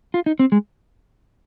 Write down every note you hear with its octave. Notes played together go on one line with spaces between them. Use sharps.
F4
D#4
C4
G#3